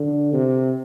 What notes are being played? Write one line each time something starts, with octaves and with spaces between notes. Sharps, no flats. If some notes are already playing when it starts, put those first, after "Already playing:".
Already playing: D3
C3